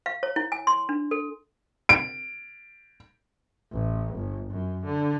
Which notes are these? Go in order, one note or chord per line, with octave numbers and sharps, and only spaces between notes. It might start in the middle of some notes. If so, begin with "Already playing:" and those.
F5
C#5
E4
G#5
C6
D4
A4
D7
A1
G1
F#2
D3